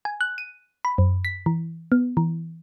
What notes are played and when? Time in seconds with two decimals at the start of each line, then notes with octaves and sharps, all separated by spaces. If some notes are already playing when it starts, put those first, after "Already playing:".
0.05 G#5
0.21 F#6
0.38 D#7
0.85 B5
0.98 F#2
1.25 B6
1.46 E3
1.92 B3
2.17 E3